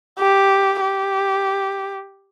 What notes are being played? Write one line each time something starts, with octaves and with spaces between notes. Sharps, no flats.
G4
G4